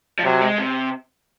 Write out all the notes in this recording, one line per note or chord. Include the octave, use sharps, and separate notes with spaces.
F3
C3 F#3
G#3
C3